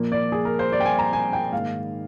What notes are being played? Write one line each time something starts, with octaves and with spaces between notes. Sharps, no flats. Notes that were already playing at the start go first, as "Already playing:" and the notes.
Already playing: A#2 F3 A#3
D5
G#4
A#4
C5
D5
G5
G#5
A#5
G#5
G5
G#2 D#3 A#3 F5